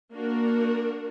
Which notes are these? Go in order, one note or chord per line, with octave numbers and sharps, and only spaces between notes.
A#3 D4 F#4 A#4